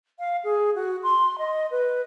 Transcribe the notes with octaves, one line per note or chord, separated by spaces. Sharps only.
F5
G#4
F#4
C6
D#5
B4